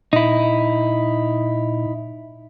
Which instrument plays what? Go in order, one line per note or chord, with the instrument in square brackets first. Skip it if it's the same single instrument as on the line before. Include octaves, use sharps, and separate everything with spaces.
[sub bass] A#2 [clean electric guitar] D#4 E4